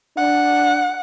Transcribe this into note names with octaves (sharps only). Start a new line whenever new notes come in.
D4 F#5